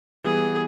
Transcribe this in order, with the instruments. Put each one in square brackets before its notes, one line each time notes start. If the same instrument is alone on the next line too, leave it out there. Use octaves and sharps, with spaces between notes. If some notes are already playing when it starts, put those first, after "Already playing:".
[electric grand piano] E3 G3 B3 E4 [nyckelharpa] G#4